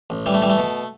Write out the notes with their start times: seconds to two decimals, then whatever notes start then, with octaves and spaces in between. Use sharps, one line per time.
0.10 A1
0.26 E3 G3
0.34 A3
0.42 E3 G3
0.50 A3
0.58 B2